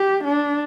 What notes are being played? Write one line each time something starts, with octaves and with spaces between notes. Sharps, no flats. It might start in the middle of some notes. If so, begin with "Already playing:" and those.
Already playing: G4
D4